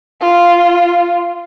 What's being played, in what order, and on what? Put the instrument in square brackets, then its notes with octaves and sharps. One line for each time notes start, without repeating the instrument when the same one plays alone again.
[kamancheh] F4